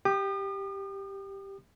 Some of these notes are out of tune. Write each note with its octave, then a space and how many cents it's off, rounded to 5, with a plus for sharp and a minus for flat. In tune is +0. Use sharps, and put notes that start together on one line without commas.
G4 +0 D#6 -45